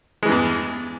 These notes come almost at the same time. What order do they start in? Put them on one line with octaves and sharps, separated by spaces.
G#3 E3 G2 E2